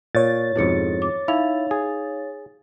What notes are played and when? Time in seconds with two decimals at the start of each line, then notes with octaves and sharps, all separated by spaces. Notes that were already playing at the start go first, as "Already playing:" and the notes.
0.15 A#2 C#5 A6
0.56 F2 G#2 B2 E4 A4 C#7
1.02 D6
1.28 D#4 E4 F5 F7
1.71 G#4